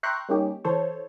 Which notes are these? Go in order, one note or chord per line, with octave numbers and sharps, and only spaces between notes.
E5 G5 A#5 C6 C#6 F#6
G3 A#3 C#4 D#4 G4
E3 A4 C5 C#5